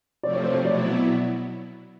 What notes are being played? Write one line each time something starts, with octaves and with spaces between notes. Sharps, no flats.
C3 F3 A3 C4 D5
C#5
C5
C#5
B2 F#3 B3 E4 D5